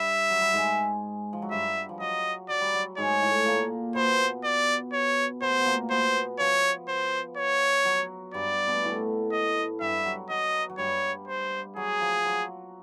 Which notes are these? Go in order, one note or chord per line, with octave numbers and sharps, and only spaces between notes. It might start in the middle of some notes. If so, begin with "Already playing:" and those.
Already playing: G2 G3 E5
F#3
G3
G#2 G#3
F3
F#3
G2 G3 E5
F3
F#3 D#5
F#3 D5
G3
F#3
G#2 G#3 C#5
A2 A3
A#2 A#3
B2 B3 C5
D5
C#5
B2 B3 C5
B3
A#2 A#3
B2 B3 C5
F3 C#5
C5
C#5
F#3
G2 G3 D5
B2 B3
A2 A3
D#5
G2 G3 E5
F#3
F#3 D#5
F#3
G2 G3 C#5
C5
F#3 G#4
F3
F#3